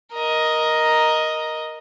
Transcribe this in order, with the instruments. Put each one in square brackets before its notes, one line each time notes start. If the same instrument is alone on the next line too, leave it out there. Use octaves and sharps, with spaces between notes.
[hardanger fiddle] A#4 D#5